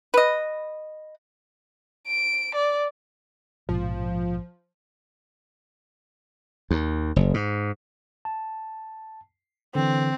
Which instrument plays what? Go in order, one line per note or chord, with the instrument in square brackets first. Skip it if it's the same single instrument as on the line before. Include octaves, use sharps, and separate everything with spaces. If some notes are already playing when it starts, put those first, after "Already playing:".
[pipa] B4 D#5
[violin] D7
D5
[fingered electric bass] A#1 G#2 B2 [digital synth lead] F3
[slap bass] D#2
F#1
G#2
[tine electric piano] A5
[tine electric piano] D3 E3 [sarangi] C4